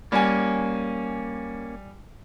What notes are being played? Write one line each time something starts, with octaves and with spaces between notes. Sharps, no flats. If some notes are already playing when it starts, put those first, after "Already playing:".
G3 A#3 C#4 G#5